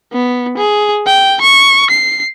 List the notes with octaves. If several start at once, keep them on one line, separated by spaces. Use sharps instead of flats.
B3
G#4
G5
C#6
C7